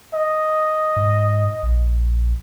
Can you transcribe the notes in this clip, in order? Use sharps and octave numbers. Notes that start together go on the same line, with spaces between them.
D#5
G#2
A#1